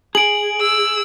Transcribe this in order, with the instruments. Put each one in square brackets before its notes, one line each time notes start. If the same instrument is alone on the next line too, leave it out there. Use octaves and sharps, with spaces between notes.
[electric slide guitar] G#4 [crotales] D7 F#7
[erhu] E6